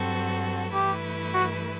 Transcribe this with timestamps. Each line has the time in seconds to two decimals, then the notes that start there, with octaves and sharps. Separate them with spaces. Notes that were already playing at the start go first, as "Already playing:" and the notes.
Already playing: G2 F#3 C4 F#4 A4
0.73 G2 E3 A3 E4 G4 B4
1.34 F#4